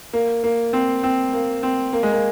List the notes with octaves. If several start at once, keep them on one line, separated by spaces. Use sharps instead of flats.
A#3
A#3
C4
C4
A#3
C4
A#3
G#3
A#3